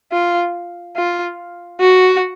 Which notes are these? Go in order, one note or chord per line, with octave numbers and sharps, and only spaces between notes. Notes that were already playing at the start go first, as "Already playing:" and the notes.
F4
F4
F#4